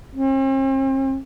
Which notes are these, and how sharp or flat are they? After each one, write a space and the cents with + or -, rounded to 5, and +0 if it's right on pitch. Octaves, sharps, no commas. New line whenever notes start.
C4 +45